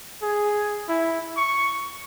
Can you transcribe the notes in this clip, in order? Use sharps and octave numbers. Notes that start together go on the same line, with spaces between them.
G#4
E4
C#6